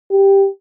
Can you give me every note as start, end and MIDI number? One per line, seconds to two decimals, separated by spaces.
0.11 0.47 67